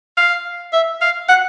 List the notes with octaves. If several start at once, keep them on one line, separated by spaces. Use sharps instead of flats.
F5
E5
F5
F#5